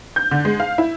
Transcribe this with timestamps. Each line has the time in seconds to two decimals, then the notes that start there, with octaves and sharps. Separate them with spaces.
0.16 G6
0.31 D3
0.45 G#3
0.60 F5
0.78 E4